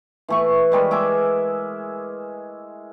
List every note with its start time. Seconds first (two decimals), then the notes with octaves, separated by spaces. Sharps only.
0.28 E3 A3 C#6
0.72 G3 G#3 A#4 B4
0.91 G#3 G#4 E5 D6